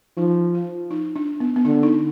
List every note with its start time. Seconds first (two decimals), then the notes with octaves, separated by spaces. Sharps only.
0.17 F3 D#4
0.55 F4
0.91 D#4
1.16 D4
1.40 B3
1.56 B3
1.65 D3 D4
1.83 D#4